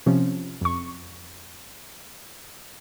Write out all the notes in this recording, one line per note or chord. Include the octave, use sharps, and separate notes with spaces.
C3 F3 C#4
F2 C#6